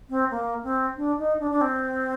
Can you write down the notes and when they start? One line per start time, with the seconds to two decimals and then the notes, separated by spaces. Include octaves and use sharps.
0.10 C4
0.31 A#3
0.63 C4
0.97 D4
1.18 D#4
1.40 D4
1.51 D4
1.61 C4